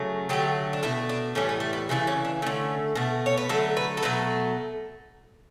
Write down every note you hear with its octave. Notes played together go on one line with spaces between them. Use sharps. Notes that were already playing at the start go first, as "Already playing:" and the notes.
Already playing: C#3 F#3 A3
D3 F#3 A3 G4
D4
B2 A3 E4
D4
A2 E3 G3 C#4
B3
A3
B3
C#3 E3 A3 B3
C#4
D4
D3 A3 C#4
B2 A3
C#5
B4
D3 F#3 A3 A4
B4
A4
B2 F#3 A3 B4